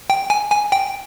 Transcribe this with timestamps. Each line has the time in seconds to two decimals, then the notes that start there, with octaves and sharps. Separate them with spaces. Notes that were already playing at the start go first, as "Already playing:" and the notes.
0.10 G5
0.30 G#5
0.51 G#5
0.72 G5